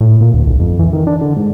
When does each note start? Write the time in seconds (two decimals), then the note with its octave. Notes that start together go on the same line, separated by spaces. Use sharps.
0.01 A2
0.21 A#2
0.34 D2
0.47 B1
0.60 F2
0.79 E3
0.93 D#3
1.07 D4
1.21 D3
1.37 G#2